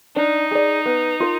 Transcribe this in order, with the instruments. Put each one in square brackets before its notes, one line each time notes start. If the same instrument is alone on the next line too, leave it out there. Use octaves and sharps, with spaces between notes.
[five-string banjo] D4 [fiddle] D#4
[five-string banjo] G#4 D5
B3
F4 A#4